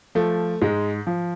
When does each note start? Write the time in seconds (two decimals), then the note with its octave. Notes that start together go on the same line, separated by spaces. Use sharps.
0.15 F3 A3
0.62 G#2 G#3
1.07 F3